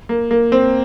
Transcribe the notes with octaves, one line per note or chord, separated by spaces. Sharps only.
A#3
A#3
C4